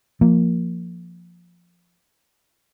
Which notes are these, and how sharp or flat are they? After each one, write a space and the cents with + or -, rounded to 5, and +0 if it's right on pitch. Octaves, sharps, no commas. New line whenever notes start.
F3 +0 A#3 -5